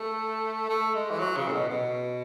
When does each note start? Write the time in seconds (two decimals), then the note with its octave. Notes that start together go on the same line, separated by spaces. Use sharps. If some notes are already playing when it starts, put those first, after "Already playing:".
Already playing: A3
0.68 A3
0.94 G#3
1.10 E3
1.19 F#3
1.36 C#3
1.48 A2
1.53 B2
1.69 B2